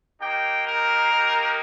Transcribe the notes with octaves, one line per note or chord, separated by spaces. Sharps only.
A#3 D#4 G4 G5
A#4
A#3 D#4 G4